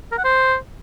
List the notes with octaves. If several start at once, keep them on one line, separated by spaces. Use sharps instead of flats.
A#4
F#5
C5